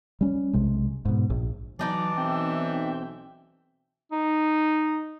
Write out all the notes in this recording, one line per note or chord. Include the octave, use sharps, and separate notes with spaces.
G3 C#4
B1 C3 G#3
G#2 B2
A#1
E3 F#3 D4 D#4 D5
B1 C4 E5 G5
D#4